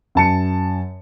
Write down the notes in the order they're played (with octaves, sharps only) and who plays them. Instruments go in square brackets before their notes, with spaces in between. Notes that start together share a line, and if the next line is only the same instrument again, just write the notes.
[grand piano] F#2 A5 C#7